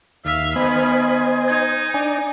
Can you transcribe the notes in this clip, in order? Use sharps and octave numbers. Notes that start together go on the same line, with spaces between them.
D#2 E5 F5
D#3 B3 C5 D#5 G#5 B5
D#4 G#6
D4 D5 G#5